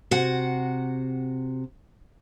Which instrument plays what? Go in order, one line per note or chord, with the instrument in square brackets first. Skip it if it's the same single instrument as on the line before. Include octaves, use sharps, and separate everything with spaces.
[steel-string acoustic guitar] C3 F#4 F#5